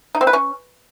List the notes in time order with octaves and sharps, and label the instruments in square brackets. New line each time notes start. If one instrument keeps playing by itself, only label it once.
[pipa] D#4
C4
B4
C#4